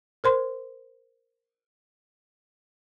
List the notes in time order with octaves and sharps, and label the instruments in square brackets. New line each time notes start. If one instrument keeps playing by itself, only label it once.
[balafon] A#4 C5 C6